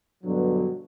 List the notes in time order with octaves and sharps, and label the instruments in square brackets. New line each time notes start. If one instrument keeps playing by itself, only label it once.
[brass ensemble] G2 B2 D3 F#3